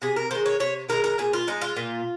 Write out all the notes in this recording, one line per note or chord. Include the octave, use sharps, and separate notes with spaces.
C3 G#4
A#4
D#3 G#3 C5
C#5
C3 C#5
D#3 G#3 A#4
A#4
A#2 G#4
F4
G#3 D#4
F4
A#2